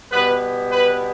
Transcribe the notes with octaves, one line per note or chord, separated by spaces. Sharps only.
B2 G3 B3 E4 B4
B4